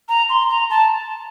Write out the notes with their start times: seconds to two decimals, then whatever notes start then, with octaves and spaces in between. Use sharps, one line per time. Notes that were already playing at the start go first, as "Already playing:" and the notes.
0.09 A#5
0.29 C6
0.50 A#5
0.70 A5